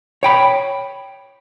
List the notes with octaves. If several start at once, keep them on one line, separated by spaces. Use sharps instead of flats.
C#5 G5 B5